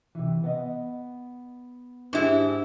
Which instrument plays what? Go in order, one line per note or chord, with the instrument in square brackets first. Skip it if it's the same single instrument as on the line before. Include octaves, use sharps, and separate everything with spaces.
[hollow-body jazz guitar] C3 E3
B3 D#5
[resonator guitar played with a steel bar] G#2 E4 [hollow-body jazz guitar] D4 G4 G#4